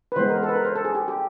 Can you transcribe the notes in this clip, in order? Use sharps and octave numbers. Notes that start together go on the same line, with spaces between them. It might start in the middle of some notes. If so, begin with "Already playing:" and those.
B4
E3 G#3 B3 C5
A#4
A4
B4
A#4
C5
A4
G#4
G4
G4